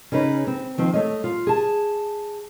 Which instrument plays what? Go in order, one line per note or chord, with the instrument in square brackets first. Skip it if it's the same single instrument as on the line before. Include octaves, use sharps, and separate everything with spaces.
[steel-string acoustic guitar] C#3 C#4 D#4 B4
C4
D#3 F3 C4
A3 C#5 D#5
F4
G#4 A5